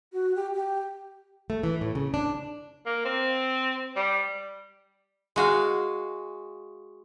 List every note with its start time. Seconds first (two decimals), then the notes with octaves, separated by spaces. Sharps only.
0.12 F#4
0.35 G4
0.54 G4
1.50 A3
1.63 E3
1.81 A2
1.95 C#3
2.14 D4
2.86 A#3
3.05 C4
3.96 G3
5.36 G#3 F#4 F5